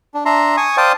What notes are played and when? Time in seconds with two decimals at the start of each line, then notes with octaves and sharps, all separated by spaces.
0.14 D4
0.25 D4 E5 A#5 C6
0.57 G#5 C#6 D#6
0.77 C5 D5 F5 G5 A5 D#6